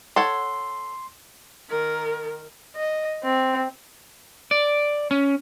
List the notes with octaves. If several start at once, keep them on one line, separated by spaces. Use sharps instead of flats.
A4 C#5 F#5 C6
D#3 A#4
D#5
C4
D5
C#4